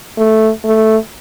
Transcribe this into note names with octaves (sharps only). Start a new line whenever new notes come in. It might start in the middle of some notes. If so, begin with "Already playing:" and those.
A3
A3